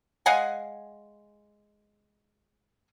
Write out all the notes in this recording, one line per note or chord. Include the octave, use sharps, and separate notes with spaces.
G#3 F5 F#5 G#5